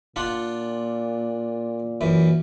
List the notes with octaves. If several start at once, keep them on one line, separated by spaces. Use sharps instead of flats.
A#2 D4 F4 F#5
F#2 E3